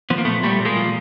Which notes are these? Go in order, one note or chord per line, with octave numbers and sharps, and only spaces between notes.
F3 B3
A#3
A#2 A3 B3
A#2 G3 A3
A#2
G#3 A#3
F3